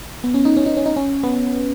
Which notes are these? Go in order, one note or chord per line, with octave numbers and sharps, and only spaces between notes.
B3
C#4
D#4
C#4
D#4
C#4
D#4
C#4
B3